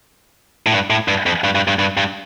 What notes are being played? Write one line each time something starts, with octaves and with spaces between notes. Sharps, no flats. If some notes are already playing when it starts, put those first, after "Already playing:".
A2
G2
A2
G2
F2
G2
G2
G2
G2
G2